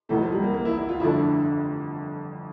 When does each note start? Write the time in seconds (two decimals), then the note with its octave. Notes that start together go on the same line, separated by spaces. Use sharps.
0.09 F1 E2 E3 A3
0.20 F3
0.32 G3
0.43 A#3
0.54 A#3
0.65 E4
0.77 E4
0.89 F4
1.00 G1 F2 D3 A3 D4 E4